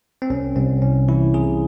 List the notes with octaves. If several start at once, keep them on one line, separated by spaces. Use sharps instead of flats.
C4
C2 C#4
C2 C4
C2 C#4
E3 E4
C3 G#4